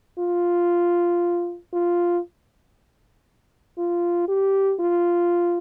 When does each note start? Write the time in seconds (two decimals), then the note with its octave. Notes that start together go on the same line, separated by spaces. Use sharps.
0.19 F4
1.73 F4
3.78 F4
4.28 G4
4.80 F4